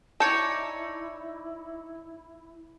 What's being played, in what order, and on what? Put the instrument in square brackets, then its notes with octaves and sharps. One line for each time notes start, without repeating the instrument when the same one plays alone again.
[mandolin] D#4 C#5 D5 [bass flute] E4 [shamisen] A5